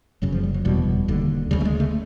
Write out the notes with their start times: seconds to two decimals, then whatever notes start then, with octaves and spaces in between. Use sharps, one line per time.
0.22 F#1 F#2 C#3 F#3
0.32 F3
0.44 G3
0.54 F#3
0.65 F1 E2 B2 G3
1.08 E1 D#2 D3
1.51 D2 C#3 G3
1.61 A3
1.65 G#3
1.80 A3